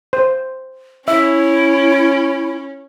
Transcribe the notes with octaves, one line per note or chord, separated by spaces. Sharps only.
C5
C#4 E4 E5